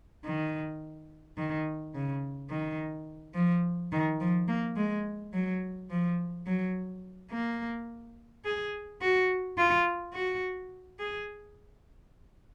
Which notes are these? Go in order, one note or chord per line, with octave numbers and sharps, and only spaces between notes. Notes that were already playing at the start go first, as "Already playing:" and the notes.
D#3
D#3
C#3
D#3
F3
D#3
F3
A#3
G#3
F#3
F3
F#3
A#3
G#4
F#4
F4
F#4
G#4